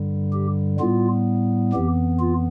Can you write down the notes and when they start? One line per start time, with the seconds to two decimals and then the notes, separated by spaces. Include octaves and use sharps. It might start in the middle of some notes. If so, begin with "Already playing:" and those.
Already playing: G2 D3 G3
0.33 G4
0.80 A2 G3 B3 F4
1.73 F2 E3 B3 G4
2.20 F4